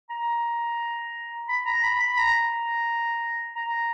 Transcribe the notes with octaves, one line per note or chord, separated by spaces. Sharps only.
A#5
B5
A#5
B5
B5
A#5
A#5